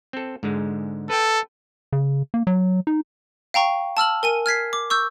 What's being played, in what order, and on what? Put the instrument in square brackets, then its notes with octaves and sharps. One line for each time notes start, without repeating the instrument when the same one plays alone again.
[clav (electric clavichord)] C4 A4
G#2 D3 G#3
[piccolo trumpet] A4 [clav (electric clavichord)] B4 G5
[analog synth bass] C#3
A#3
F#3
D#4
[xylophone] F5 G5 A#5 C#6
A5 E6 F6 F#7
A#4 G#5 D#7
F6 G#6 B6 C7
D6
C#6 E6 G6